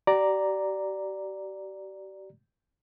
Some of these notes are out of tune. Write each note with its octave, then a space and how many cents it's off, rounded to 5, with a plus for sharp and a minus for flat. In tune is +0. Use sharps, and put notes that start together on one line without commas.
G4 -40 D5 +0 A#5 +0